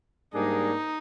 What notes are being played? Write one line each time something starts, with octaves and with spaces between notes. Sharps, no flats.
G#2 G3 A#3 D4 D#4 G#4